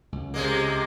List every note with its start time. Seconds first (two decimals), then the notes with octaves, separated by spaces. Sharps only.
0.12 C#2
0.34 C3 G#3 A#3